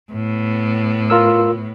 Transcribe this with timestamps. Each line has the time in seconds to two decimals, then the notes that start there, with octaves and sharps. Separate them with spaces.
0.13 A2 B3
1.10 F4 A#4 E6